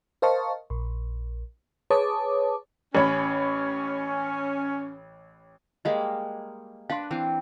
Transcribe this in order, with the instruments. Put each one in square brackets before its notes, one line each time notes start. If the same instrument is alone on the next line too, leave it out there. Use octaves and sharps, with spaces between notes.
[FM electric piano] A#4 C5 D#5 F5 A5 C#6
A#1
G#4 B4 C#5 A5 D6 D#6
[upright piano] A1 C#5 B5 [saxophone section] C#4
[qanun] G3 G#3 A#3 [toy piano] D#5 F5
[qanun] D4 B4 [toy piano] F5 C6
[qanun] E3 C4